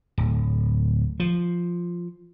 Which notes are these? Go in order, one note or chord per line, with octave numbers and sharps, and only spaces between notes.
D1
F3